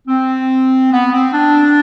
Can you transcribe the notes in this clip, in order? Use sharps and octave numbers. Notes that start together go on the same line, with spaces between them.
C4
B3
C4
D4